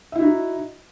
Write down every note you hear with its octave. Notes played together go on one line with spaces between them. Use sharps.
D#4 E4 F#4 E5